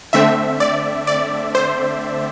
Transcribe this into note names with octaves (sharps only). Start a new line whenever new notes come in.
D3 A3 C4 E5
D5
D5
C5